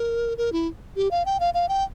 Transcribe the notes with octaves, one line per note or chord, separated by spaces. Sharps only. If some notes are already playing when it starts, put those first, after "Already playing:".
Already playing: A#4
A#4
E4
G4
F5
G5
F5
F5
G5